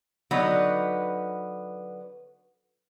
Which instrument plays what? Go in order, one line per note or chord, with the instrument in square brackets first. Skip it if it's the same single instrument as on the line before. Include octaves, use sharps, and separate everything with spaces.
[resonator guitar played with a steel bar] D3 F#3 B3 D#4 B4